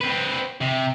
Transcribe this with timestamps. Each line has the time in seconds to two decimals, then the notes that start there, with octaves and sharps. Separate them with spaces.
0.01 C4 B4
0.61 C3